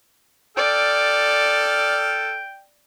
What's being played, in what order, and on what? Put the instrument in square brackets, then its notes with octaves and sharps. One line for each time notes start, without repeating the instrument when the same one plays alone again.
[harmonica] A4 F6 [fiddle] D5 [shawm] G5